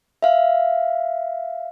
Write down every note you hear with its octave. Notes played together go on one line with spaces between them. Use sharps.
E5 F5